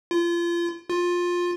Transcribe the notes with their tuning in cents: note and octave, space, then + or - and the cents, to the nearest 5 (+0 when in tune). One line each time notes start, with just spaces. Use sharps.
F4 -30
F4 +15